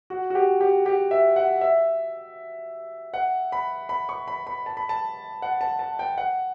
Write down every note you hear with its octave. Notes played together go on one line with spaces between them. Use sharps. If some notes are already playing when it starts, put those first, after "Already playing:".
F#4
F#4
G4
G4
G4
E5
F#5
E5
F#5
B5
B5
C#6
B5
B5
A5
B5
A5
F#5
A5
A5
G5
F#5